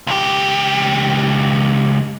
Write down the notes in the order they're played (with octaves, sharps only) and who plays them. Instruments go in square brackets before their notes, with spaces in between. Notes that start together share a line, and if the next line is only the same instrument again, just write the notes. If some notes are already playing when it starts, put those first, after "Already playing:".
[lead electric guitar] C#2 G4